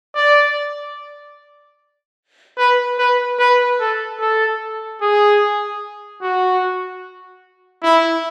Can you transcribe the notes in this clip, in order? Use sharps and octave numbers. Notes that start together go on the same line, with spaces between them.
D5
B4
B4
B4
A4
A4
G#4
F#4
E4